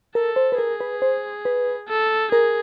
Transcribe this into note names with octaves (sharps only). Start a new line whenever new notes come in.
A4 A#4
C5
B4
G#4 A#4
B4
C5
B4
A4
G#4 A#4